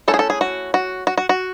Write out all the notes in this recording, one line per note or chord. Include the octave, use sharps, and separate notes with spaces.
A3 C#4 E4 A4
G#4
A4
G#4
F#4
F#4
F#4
F#4
F#4